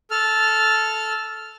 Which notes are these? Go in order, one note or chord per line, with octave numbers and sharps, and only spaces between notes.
A4 F6